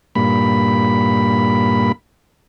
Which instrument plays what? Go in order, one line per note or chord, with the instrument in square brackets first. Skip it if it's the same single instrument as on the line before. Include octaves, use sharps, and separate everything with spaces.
[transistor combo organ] G2 A#2 B5